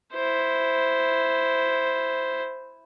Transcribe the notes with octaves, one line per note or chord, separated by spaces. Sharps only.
E4 C5